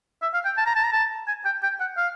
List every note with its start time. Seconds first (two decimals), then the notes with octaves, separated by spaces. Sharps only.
0.22 E5
0.34 F5
0.45 G5
0.57 A5
0.66 A#5
0.75 A5
0.83 A#5
0.93 A5
1.28 G#5
1.45 G5
1.63 G5
1.80 F#5
1.97 F5